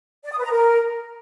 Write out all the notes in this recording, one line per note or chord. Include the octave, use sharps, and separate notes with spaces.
D5
D#6
B4
A#5
A#4